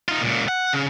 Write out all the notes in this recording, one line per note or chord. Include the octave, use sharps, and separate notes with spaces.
D#4 F4
C#2 A#2
F#5
C#3